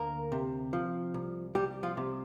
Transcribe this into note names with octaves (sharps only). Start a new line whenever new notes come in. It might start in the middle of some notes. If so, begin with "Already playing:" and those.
Already playing: D2 A#3 A#4
C3
F3
C2
C2 G3 G4
F3 F4
C3